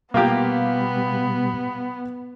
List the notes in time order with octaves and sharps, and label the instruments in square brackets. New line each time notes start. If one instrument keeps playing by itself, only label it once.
[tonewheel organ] B2 G3 [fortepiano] A#3 F4 G4 [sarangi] B3